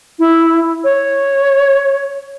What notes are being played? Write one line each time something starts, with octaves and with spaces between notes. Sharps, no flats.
E4
C#5